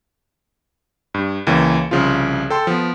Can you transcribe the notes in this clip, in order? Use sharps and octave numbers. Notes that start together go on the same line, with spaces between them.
G2
C#2 E3 A#3 C#5
C2 C#3 F3 F4
A4 G5 A5 C6
F3 B3